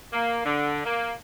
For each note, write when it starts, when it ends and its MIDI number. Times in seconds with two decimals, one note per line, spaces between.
0.12 0.41 58
0.45 0.83 50
0.85 1.12 58